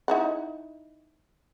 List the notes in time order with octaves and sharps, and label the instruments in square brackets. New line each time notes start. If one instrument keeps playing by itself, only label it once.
[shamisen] D#4 E4 F#5